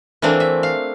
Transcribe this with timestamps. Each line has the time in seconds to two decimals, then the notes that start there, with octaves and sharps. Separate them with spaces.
0.22 E3 A3 A#3 C4 D4
0.40 E5
0.63 F5